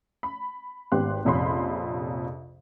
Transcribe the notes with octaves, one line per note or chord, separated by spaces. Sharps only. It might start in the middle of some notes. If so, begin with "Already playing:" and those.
B5
G#1 B3 G4 C6 F#6
A#1 F2 C3 C#4 B5 C6